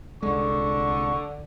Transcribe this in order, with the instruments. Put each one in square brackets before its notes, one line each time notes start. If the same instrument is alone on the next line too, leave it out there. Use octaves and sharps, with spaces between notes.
[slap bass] C2 G#3 [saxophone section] D3 [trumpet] C#6